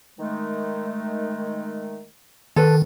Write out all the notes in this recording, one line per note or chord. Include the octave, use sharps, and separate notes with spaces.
D#3 G#3 A3
D#3 A4 B4